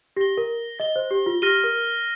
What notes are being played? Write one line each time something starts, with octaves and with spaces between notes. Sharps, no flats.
G4 A#6 G7
A#4
D#5 A#6 G7
C5
G4
F4
G4 F6 A#6 D#7 G7
A#4